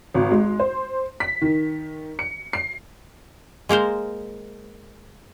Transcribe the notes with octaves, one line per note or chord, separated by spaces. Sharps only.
G#1
G#3
C5
B6
D#3
C#7
C7
G#3 A#3 A#4 C5